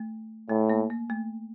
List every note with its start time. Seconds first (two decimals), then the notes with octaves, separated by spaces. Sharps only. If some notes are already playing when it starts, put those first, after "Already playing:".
Already playing: A3
0.49 A2 A3
0.70 A#3
0.90 A#3
1.10 A3